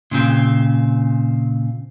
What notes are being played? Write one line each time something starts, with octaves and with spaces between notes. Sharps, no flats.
A#2 C#3 C4